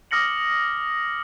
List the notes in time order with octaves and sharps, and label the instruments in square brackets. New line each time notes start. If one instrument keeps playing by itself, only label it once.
[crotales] D6 D#6 F6 A#6 C#7 F#7